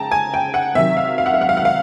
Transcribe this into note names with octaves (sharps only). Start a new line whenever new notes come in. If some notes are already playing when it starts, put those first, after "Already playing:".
Already playing: C#3 G5 A5 A#5
G#5
G5
F#5
C3 D#3 F#3 E5
F5
F5
F#5
F5
F#5
F5
F#5
F5